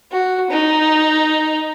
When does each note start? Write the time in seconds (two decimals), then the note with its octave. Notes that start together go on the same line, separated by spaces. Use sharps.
0.12 F#4
0.50 D#4